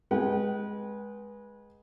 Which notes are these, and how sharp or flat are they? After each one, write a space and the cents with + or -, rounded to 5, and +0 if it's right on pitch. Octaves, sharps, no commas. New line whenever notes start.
G#3 +0 B4 -20 G5 -45